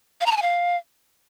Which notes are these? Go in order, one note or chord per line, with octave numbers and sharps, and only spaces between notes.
F5
A#5
A5
G#5
F5